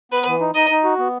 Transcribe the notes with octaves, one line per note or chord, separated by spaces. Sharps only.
B3 B4
E3
D#4
D#4 D#5
D#4
F#4
B3